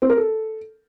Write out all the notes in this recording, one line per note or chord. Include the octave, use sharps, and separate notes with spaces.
C4
A#4
A4